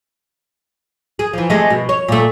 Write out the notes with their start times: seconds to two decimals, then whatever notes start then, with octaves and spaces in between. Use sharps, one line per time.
1.19 G#4
1.33 E3 F3
1.50 C3 G#3 A3
1.71 B2
1.89 C#5
2.08 A#2 A3